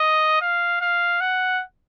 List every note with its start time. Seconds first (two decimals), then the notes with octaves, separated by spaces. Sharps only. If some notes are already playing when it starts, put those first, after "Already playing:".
Already playing: D#5
0.41 F5
0.81 F5
1.21 F#5